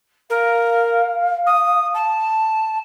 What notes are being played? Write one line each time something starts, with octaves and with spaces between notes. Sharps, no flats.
A#4 F5
D#6
A5